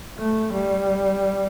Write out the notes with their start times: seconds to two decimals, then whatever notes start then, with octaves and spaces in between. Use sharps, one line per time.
0.18 A3
0.52 G3